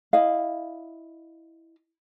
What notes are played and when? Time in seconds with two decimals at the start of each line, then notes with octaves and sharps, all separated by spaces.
0.13 E4 D#5 F5